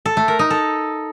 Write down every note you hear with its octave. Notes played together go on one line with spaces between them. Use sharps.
A4
A3
A#4
D#4
A4